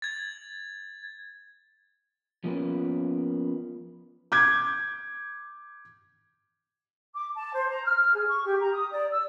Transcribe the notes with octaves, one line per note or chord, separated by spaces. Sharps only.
G#6 A6
F3 A#3 B3 C#4
D6 G6 G#6
D6
A5
C5
A#5
F6
G#4
C#6
G4
A#5
D#6
D5
E6